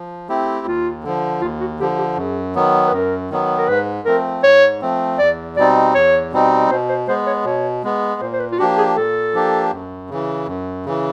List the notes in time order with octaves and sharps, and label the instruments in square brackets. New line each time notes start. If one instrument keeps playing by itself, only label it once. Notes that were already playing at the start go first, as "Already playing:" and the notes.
Already playing: [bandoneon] F3
A3 C4 E4 G4
[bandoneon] D#2 [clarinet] F4
[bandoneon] D3 F3
[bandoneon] D#2 [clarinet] F4
[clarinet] F#4
[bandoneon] D3 F3 [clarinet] G4
[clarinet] G4
[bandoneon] F#2 [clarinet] G#4
[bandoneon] D#3 F#3 B3
[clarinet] B4
[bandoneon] F#2 [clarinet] A#4
[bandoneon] D#3 F#3 B3
[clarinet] A#4
[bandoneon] G#2 [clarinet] B4
[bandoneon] F3 A3 C4 [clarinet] A#4
[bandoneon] G#2 [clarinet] C#5
[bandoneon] F3 A3 C4
[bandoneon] E2 [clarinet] D5
[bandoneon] B2 G3 C4 D#4 [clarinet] D5
[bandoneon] E2 [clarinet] C#5
[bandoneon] B2 G3 C4 D#4
[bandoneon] B2 [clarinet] C5
[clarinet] C5
[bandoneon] G#3 B3 [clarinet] C5
[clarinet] C#5
[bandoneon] B2 [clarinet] C#5
[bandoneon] G#3 B3
[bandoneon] A#2 [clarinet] C5
[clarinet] C5
B4
F4
[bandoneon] F3 A#3 D4 G4 [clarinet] F#4
[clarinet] G#4
[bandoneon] A#2 [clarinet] A4
[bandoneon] F3 A#3 D4 G4
F#2
C#3 E3
F#2
C#3 E3